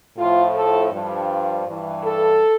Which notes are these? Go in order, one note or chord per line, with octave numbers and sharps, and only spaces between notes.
A2 F3 F4
A4
G2 F3
G2 E3
A4